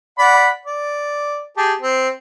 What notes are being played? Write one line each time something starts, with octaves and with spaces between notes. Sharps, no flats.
D5 F#5 B5
D5
G4 G#4 A5
C4